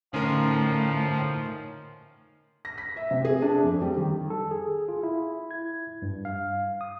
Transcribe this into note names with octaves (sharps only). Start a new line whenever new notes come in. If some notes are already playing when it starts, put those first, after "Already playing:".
A2 D3 F3 C#4 D#4 A#4
A#6
B6
E5
C3
G#4
D4
F2
G3
D#3
A4
G#4
F4
E4
G#6
G2
F5
D#6